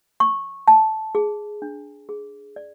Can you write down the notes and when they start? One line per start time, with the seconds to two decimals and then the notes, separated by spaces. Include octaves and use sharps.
0.20 C#6
0.68 A5
1.15 G#4
1.62 D4
2.09 G#4
2.56 D5